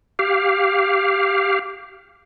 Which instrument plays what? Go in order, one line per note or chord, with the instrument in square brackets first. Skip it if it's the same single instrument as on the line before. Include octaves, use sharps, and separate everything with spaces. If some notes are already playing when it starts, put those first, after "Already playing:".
[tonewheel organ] G4 F5